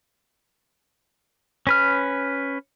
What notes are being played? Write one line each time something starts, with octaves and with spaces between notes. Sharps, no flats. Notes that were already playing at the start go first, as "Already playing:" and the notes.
C#4 B4 F6